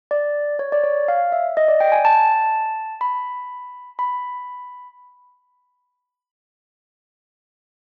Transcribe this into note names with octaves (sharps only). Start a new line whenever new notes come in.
D5
C#5
D5
C#5
F5
E5
D#5
D5
G5
G#5
A5
B5
B5